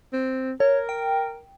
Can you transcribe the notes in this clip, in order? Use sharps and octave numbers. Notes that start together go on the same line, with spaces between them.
C4
A#4 C#5
G5